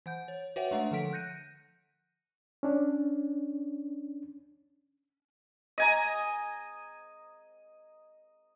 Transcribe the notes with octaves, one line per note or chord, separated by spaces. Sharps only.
E3 F#5 G6
C#5
F#4 B4 C#5 E5 F#5 G5
G#3 A3 D4 C#5 E5 F#5
D3 F3 A4 F#5 B6 D7
F#6 G6 A#6 C#7 D#7
C#4 D4
D#5 G#5 A#5